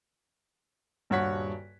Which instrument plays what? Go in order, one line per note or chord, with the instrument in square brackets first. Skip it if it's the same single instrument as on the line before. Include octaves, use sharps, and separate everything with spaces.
[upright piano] D#1 G2 F#4 C#5 F#5 B6